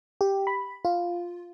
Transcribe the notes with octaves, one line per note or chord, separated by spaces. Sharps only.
G4
B5
F4